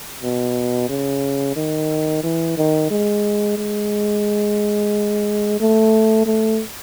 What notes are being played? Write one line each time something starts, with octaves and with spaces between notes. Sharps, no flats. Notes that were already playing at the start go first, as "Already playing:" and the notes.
B2
C#3
D#3
E3
D#3
G#3
G#3
A3
A3